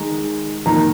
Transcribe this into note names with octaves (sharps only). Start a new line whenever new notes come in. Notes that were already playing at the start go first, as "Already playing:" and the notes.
Already playing: D#3 G#3 A#5
D#3 A#3 A#5